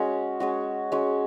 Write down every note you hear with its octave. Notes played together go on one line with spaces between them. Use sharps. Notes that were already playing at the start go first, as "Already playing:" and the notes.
Already playing: G#3 C#4 F#4
G#3 C#4 F#4
G#3 C#4 F#4